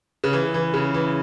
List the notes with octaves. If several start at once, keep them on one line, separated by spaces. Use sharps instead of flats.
C#3
E3
E3
C#3
E3